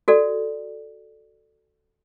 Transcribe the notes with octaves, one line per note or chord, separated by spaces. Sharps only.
F#4 A4 D5